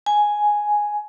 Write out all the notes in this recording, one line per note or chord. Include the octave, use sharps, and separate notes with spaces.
G#5